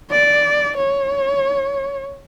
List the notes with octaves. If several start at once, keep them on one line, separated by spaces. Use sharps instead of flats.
D5
C#5